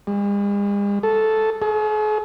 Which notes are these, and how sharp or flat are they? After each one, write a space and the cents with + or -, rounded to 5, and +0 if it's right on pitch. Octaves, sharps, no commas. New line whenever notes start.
G#3 -45
A4 -5
G#4 +45